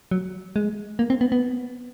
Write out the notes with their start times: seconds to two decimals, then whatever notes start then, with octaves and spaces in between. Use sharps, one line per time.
0.11 F#3
0.56 G#3
0.99 A#3
1.10 C4
1.21 B3
1.32 B3